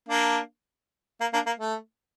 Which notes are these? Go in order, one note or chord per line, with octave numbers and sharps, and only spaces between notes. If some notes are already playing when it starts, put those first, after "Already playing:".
A#3 D4
A#3
A#3 D4
A#3
A3